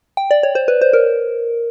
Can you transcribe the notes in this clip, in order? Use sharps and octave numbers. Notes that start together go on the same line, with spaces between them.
G5
D5
C#5
C5
B4
C5
A#4